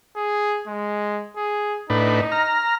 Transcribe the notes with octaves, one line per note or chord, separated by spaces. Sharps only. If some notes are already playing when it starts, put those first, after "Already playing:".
G#4
G#3
G#4
A2 D4 D#4 B4
A#5 F6